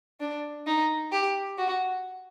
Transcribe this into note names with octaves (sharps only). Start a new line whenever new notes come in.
D4
D#4
G4
F#4